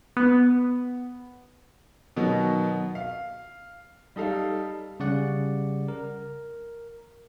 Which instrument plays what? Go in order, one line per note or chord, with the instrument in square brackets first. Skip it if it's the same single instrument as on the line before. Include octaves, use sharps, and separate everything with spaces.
[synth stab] B3
[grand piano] B2 D#3 F#3
F5
G3 D#4 A4 F5
[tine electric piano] C#3 G3 D5 F#5
A#4